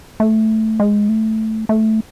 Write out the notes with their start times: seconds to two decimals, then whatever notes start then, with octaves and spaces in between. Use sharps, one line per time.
0.20 A3
0.80 G#3
1.09 A3
1.69 A3